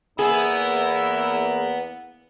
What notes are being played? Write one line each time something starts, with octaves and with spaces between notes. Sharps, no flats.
E2 A#3 B3 E4 G#4